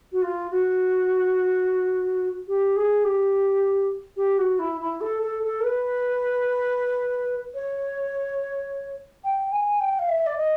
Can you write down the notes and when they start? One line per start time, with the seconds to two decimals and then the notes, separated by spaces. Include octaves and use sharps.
0.12 F#4
0.22 F4
0.51 F#4
2.48 G4
2.76 G#4
3.04 G4
4.16 G4
4.38 F#4
4.59 E4
4.80 E4
5.01 A4
5.22 A4
5.43 A4
5.60 A#4
5.64 B4
7.54 C#5
9.24 G5
9.52 G#5
9.80 G5
9.99 F5
10.08 E5
10.26 D5
10.37 D#5